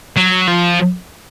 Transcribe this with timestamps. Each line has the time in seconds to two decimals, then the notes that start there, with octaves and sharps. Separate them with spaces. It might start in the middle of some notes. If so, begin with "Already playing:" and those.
0.17 F#3
0.48 F3